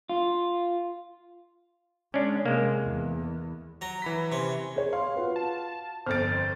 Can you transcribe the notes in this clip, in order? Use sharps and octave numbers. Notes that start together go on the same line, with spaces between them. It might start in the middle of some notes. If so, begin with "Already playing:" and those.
F4
G#3 C#4 D4
C3 G#3 A#3
E2
F#3 A#5
E3 B5 B6
C3 C#4
G#4 C#5
F5 C6
F4 F#4 B4
A5
G1 F2 C5 F6 A6 D7